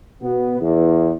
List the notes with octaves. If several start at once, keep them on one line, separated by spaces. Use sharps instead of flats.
B2 B3
E2